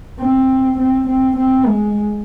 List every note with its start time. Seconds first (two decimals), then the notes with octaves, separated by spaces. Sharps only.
0.20 C4
0.79 C4
1.08 C4
1.37 C4
1.66 G#3